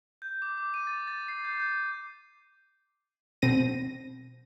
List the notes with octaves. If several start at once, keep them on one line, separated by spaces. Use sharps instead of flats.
G6
D6
D6
D#7
A6
A6
C7
G6
G6
B2 C4 A#6 D#7